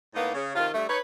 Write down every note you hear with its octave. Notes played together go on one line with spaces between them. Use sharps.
A2 A#3 B3 D#4
C#3
C3 D#3 F4
G2 A3
D#4 B4 C#5